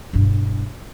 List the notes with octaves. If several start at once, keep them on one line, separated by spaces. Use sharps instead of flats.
E1 G2